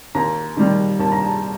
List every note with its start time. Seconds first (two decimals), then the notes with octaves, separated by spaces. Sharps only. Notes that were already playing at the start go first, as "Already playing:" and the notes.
0.15 D#2 A#5
0.57 D#3 G3
0.99 D#2 A5
1.12 A#5
1.23 A5